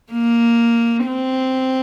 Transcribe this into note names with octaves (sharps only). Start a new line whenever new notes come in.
A#3
C4